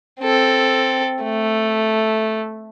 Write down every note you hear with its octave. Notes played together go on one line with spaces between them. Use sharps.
C4 A4
A3